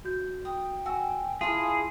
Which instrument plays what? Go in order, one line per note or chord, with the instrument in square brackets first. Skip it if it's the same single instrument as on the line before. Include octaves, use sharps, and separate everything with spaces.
[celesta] F#4 G6
[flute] G5 [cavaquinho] D#6
[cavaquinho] F#4 [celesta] G#5 E6
[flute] E4 [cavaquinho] F4 A5 D#6 [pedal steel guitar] G#4